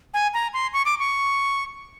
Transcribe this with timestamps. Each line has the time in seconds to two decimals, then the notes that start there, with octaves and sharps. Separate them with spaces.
0.14 G#5
0.34 A#5
0.54 C6
0.73 C#6
0.85 D6
0.99 C#6